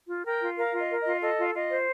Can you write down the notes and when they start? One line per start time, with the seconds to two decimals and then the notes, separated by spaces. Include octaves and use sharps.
0.09 F4
0.26 A#4 G5
0.41 F4
0.57 A#4 F5
0.74 F4
0.80 D#5
0.90 A#4
1.01 D#5
1.06 F4
1.22 A4 D#5
1.39 F4
1.54 F4 D#5
1.70 C5